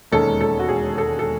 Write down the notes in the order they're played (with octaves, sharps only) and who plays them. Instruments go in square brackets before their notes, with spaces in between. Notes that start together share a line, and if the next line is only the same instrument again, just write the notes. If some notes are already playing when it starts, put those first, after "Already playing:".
[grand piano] E1 D#2 D#3 G#3 C#4 [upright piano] A4
[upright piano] A4
F#4
G#4
A4
A4